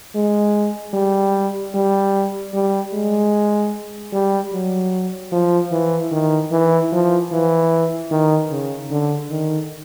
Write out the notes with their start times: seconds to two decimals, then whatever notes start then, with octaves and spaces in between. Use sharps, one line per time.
0.15 G#3
0.94 G3
1.75 G3
2.54 G3
2.94 G#3
4.13 G3
4.53 F#3
5.32 F3
5.72 E3
6.12 D#3
6.51 E3
6.92 F3
7.32 E3
8.11 D#3
8.51 C#3
8.90 D3
9.31 D#3